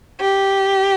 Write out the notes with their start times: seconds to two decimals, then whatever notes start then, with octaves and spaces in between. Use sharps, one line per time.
0.20 G4